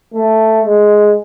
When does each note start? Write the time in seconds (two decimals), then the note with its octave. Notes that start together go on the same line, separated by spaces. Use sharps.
0.14 A3
0.64 G#3